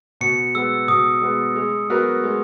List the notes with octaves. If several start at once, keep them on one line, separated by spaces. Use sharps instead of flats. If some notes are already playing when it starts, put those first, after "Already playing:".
B2 C#7
G#3 B3 E6
B2 D#6
G#3 B3
G#3
B3 F#4 A#4
G#3